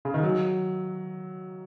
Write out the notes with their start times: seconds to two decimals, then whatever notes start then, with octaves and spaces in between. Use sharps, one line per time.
0.05 C#3
0.14 D#3
0.23 F#3